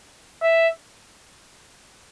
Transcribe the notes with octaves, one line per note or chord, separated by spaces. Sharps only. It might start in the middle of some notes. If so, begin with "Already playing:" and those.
E5